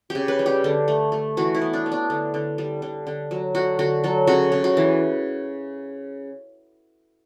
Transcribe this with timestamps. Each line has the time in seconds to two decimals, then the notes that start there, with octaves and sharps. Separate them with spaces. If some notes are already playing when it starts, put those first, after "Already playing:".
0.10 G4
0.15 C#3
0.28 B4
0.39 G3
0.46 G4
0.64 D3
0.88 A3
1.12 A3
1.37 E3 F#4
1.55 E4
1.61 B3
1.73 D4
1.86 B3
1.92 D4
2.10 D3
2.34 D3
2.58 G3
2.82 D3
3.07 D3
3.31 F#3
3.55 D3 F#4
3.79 D3 F#4
4.04 F#3 A4
4.27 C#3 F#4
4.52 C#3
4.64 F#4
4.77 E3